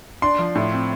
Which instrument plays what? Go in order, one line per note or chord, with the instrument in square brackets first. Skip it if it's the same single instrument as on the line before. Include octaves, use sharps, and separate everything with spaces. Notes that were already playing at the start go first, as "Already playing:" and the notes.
[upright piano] D4 [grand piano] C6
[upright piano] F3
A2
C4